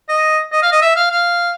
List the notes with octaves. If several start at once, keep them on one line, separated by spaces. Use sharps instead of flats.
D#5
D#5
F5
D#5
E5
F5
F5